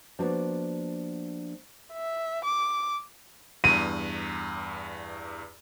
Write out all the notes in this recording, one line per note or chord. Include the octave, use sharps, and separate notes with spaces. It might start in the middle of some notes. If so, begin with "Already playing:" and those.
F3 A#3 B3 D4 F#4
E5
D6
E2 G2 D#7